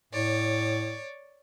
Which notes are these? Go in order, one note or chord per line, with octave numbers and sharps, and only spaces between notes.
A2 C#5 D5